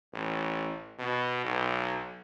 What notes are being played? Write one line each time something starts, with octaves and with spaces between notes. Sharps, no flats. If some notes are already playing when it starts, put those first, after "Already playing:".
A1
B2
B1